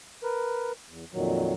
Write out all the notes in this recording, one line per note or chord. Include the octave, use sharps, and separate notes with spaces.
A#4 B4
E2
F2 A#2 D#3 F#3